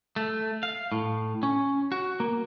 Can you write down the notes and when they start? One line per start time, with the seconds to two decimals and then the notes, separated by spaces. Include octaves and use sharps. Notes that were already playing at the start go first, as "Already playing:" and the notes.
0.16 A3
0.63 F5
0.92 A2
1.43 C#4
1.92 F#4
2.20 A#3